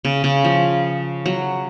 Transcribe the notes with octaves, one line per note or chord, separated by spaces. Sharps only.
C#3
C#3
F3
F#3